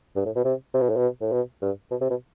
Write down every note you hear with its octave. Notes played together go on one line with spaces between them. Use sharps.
G2
A2
B2
C3
C3
B2
A2
B2
A2
B2
G2
B2
C3
B2